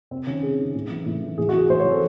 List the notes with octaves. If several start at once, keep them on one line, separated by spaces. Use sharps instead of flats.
C3 C4
D#3 C#4
C3 G#4
D#3
A2
E3
A2
E3
A2 G#4
F#4
E3 G#4
A2 C5
C#5
E3
A4